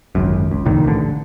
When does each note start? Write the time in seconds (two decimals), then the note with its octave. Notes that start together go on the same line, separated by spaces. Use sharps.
0.15 G#1 C#2 F#2
0.51 C#2
0.65 C2 F2 A#2 D#3
0.85 A1 D3